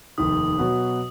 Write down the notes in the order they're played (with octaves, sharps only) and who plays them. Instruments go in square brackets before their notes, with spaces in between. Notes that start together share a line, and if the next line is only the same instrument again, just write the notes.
[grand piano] F1 D#2 D#3 [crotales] D#6
[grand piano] B2 F#3 B3 F#4 B4